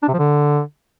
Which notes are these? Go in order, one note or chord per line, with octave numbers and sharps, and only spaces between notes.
D4
C3
F3
D3